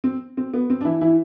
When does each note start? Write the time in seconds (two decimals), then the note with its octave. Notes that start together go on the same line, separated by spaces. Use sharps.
0.04 C4
0.37 C4
0.54 B3
0.70 C4
0.81 D4
0.85 E3 E4
1.01 E3 E4